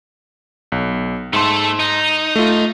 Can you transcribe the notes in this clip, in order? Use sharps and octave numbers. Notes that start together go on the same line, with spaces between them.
B1
G#2 A3 A4 C6
D#4
A3 F4